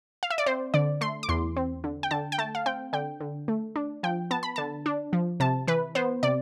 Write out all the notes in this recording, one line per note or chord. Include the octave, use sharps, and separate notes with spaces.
F5
E5
D5
C4 C5
D3 D5
A3 C6
D6
E2 C6
C4
D3
G5
D3 A5
G5
A3 A5
F5
C4 G5
D3 G5
D3
A3
D4
F3 G5
B3 A5
B5
D3 A5
D4
F3
C3 A5
E3 B4
B3 C5
C3 D5